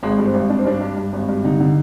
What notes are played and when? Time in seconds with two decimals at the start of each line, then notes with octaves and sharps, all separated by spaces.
0.03 G#1 G#3
0.18 G2
0.26 C4
0.34 G#1
0.49 G2 D4
0.59 C4
0.65 G2 D4
0.81 G2
0.97 G2
1.13 G#1
1.28 G2
1.44 D3 D#4
1.60 D3